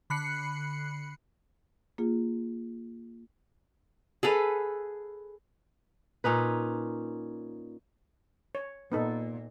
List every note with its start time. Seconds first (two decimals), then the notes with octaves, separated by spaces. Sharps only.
0.10 D3 B5 F#6 C7 C#7
1.98 A#3 F4 G#4
4.23 G#4 A4 B4 F5
6.24 A#2 C#4 D#4 B4
8.55 C#5
8.92 A#2 B3 D#4 A4